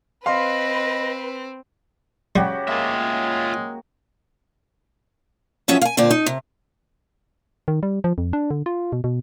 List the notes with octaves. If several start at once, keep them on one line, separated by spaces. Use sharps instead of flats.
C4 B4 D#5 F5 C6
C#3 G3 F#4 G4
G#3 A#3 F4 E5
F3 F#3 C#4 G#4 E5
F5 G#5
A#2 D3 C4 D5
D#4
C3
D#3
G3
F3
F2
D4
D3
F4
B2
B2